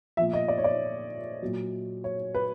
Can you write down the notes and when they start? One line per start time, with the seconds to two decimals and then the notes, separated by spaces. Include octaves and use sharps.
0.17 A#2 F3 E5
0.33 D#5
0.48 D5
0.58 C#5
0.64 D5
1.42 A#2 F#3
2.04 C#5
2.35 B4